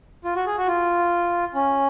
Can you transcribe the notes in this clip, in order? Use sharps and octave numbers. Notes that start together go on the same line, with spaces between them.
F4
F#4
G#4
F#4
F4
C#4